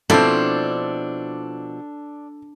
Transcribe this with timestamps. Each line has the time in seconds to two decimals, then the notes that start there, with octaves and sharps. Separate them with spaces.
0.10 B2 F3 C4 D4 E4 A4 D5